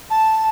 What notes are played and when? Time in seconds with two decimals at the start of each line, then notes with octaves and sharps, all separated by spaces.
0.10 A5